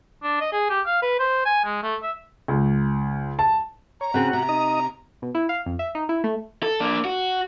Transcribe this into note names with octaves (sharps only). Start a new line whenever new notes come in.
D4
D#5
G#4
G4
F5
B4
C5
G#5
G#3
A3
E5
C#2
A5
C#5 A#5
C#3 C4 C#4 F#4 F#5
C3 A#5
D#4 D#5 D#6
B2
E4
F5
F2
E5
D#4
E4
A3
A4
A#3 D4
F#4